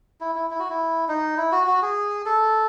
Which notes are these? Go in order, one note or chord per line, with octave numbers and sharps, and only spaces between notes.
E4
E4
E4
F#4
E4
D#4
E4
F#4
F#4
G#4
A4